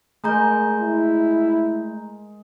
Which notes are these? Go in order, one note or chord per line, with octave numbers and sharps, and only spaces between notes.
G#3 A3 A#4 A#5 G6
E4